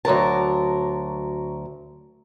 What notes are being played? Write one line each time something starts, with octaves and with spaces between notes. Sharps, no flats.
D2 F#3 A#4 A5